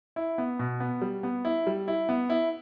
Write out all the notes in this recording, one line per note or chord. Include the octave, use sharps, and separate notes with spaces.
E4
B3
B2
B3
G3
B3
E4
G3
E4
B3
E4